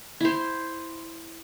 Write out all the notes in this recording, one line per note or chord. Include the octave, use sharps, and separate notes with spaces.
E4 C5